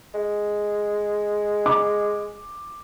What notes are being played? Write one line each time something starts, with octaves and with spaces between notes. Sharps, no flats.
G#3
D6